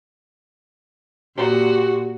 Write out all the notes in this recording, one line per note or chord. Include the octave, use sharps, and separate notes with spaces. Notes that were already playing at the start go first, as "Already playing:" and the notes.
A#2 F#4 G4